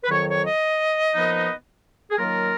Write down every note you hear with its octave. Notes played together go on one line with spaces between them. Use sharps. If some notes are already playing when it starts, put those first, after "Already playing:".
B4
F2 D#3 F#3 C#5
C#5
D#5
A#2 F3 B3 D#4
G#4
D#3 F#3 A#3 F4 A#4